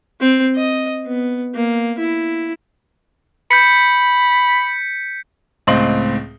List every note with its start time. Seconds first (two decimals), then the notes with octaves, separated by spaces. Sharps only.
0.20 C4
0.55 D#5
1.07 B3
1.55 A#3
1.99 E4
3.51 B5 G6 B6 C#7
5.67 C#2 A2 C4 D#5 C6 F#7